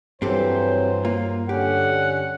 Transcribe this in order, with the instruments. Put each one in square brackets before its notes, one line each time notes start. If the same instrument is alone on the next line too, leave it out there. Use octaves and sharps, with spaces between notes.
[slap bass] G2 [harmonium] E3 F#3 [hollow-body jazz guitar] C4 G4 A4 [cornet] C5
[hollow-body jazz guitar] A#3 F4
[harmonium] D3 C#4 [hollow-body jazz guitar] G4 [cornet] F#5